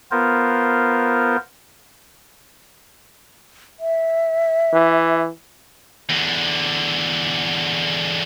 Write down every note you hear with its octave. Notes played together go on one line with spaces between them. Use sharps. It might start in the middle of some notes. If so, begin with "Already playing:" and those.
B3 F4 A#4 C5
E5
E3
E2 D3